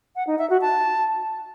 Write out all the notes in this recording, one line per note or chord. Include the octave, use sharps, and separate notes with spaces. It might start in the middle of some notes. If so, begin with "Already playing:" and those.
F#5
D#4
E5
F#4
A5